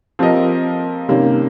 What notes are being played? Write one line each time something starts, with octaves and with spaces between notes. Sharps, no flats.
F3 C4 G4 A#4 D#5
C3 D#3 G3 A#3 C#4